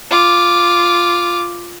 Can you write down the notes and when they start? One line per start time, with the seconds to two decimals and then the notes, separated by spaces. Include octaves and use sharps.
0.11 F4 D6